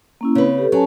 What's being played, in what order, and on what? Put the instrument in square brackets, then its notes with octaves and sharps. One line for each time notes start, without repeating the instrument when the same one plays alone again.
[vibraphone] A#3 C#4 E4
[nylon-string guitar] C#3 B4 [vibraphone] C4
[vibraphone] G4 A4
[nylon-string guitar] F#3 [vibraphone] C#4 G#5 A5